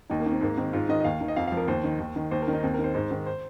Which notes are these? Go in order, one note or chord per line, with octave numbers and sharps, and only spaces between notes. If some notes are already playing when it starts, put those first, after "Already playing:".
D#2 D#4
A#3
D#3
C4
G#2 A#3
D#3 C4
G#2 F4
D#3 D#5
D#5
D#2 F5
D#3
D#5
F2 F5
F3 F5
A#4
D#2 C5
D#3
D#2
D#3
D#2 C5
A#4
D#3
D#4
D#2 C4
A#4
D#3
C5
G#2 C5
D#3
C5